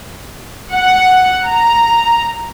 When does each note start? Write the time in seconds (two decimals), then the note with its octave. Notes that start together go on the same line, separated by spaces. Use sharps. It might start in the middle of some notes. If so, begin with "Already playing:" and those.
0.73 F#5
1.46 A#5